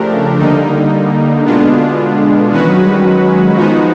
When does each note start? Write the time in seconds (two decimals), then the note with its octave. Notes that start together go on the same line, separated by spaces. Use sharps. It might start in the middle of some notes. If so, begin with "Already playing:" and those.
Already playing: C#3 F3 A3 D4 G4 A#4
0.38 D3 G3 A#3 D#4
1.45 B2 G#3 B3 D4 F4
2.51 D#3 E3 G#3 C#4 F#4 B4
2.68 F#3
2.86 G3
3.04 F#3
3.53 F#3
3.57 D#3 F3 G#3 B3 D#4 F#4